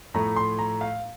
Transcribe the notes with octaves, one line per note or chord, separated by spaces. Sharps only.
A2 F3 A3 A#5
C6
A#5
F5